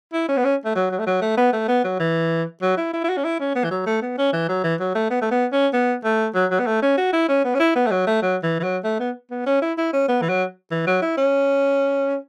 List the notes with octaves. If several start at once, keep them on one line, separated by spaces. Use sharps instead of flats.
E4
C#4
B3
C#4
A3
F#3
F#3
A3
F#3
A3
B3
A3
B3
F#3
E3
F#3
E4
E4
E4
F#4
C#4
E4
C#4
B3
E3
F#3
A3
B3
C#4
E3
F#3
E3
F#3
A3
B3
A3
B3
C#4
B3
A3
F#3
F#3
B3
A3
C#4
F#4
E4
C#4
B3
C#4
E4
B3
A3
F#3
A3
F#3
E3
E3
F#3
A3
B3
B3
C#4
E4
E4
C#4
B3
E3
F#3
E3
F#3
E4
C#4